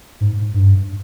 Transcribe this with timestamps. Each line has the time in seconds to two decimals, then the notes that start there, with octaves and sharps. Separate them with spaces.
0.21 G#2
0.54 G2